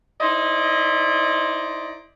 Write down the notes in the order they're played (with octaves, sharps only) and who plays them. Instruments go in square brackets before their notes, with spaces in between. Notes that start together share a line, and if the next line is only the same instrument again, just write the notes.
[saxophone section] D#4 E4 C5 D5 D#5